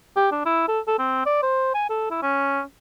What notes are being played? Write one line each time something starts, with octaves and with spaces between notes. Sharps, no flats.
G4
D4
E4
A4
A4
C4
D5
C5
G#5
A4
E4
C#4